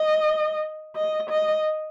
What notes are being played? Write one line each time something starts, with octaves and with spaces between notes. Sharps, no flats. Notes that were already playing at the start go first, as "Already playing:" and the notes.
Already playing: D#5
D#5
D#5